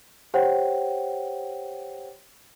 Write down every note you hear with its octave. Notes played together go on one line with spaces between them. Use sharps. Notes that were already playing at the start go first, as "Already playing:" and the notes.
G4 C5 C#5 F#5 G5